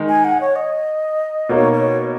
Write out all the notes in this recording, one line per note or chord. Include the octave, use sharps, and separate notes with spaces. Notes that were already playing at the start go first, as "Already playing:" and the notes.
Already playing: D#3 G#3 D#4
G#5
F#5
C#5
D#5
B2 A#3 D#4 C#5
C#5